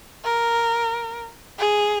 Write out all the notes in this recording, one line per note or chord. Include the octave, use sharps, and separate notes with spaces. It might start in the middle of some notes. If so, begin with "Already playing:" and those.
A#4
G#4